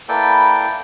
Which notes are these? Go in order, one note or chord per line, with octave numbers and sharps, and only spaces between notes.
A#3 E4 A4 B4 D5 G5